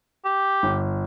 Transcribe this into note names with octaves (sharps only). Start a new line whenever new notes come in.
G4
G1